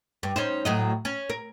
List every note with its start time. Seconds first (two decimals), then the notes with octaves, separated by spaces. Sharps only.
0.23 G2
0.36 C#4 D#4 C5
0.65 A2 F#3 D#5
1.05 C#4
1.30 A#4